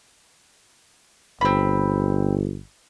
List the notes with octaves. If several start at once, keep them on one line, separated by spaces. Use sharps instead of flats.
G1 C4 B5